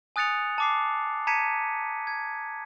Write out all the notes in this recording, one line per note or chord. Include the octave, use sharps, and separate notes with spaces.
G#5 D#6 F#6 A6 C#7 F7
A5 D6 C7
A5 A#5 G#6 B6 C#7 D#7
G#6